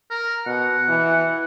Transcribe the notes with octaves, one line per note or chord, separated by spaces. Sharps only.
A#4
B2 F#5
E3